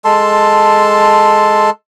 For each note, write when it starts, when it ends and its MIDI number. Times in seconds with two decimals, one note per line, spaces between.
0.05 1.70 56
0.05 1.70 69
0.05 1.70 81
0.05 1.70 84